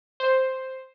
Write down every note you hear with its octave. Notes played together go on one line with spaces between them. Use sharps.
C5